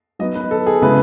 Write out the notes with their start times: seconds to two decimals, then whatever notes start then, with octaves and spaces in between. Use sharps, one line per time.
0.19 F#3 B3 D#4 D#5
0.35 B4
0.51 A4
0.66 G#4
0.82 C#3 G#3 B3 E4 B4